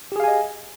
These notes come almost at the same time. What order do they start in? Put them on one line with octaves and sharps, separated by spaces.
G4 G#4 F5 G#5 D#5